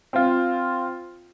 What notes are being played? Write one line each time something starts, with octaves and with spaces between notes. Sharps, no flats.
C4 F4